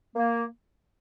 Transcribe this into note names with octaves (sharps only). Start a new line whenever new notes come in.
A#3